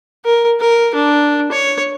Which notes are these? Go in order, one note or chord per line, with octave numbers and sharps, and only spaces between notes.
A#4
A#4
D4
C#5